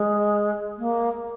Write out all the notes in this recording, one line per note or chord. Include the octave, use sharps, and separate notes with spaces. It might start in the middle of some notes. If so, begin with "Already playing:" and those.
Already playing: G#3
A#3